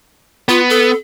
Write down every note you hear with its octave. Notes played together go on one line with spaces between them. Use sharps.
B3 F4
A4